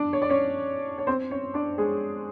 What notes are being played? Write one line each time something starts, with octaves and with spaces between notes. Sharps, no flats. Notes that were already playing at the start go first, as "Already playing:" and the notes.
Already playing: D4 D5
C#5
D5
C#4 C#5
C#5
C4 C5
C#4 C#5
D4 D5
G#3 G#4